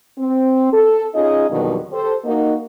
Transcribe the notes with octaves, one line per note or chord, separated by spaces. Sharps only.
C4
A4
C#4 D#4 F4 G#4 D#5
F2 B2 D3 D#3 F#3 G3
G4 A4 C5
A#3 D#4 F#4